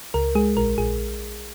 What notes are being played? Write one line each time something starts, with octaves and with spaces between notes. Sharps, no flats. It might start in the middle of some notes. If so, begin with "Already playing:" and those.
C#2 A#4
G#3 G#4
A#1 A#4
A#1 G#4